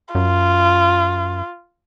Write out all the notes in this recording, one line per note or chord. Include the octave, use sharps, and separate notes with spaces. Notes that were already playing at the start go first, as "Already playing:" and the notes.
F#2 F4